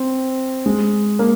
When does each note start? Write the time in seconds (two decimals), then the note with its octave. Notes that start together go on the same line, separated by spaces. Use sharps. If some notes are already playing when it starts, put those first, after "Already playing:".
Already playing: C4
0.66 G#3
1.19 A#3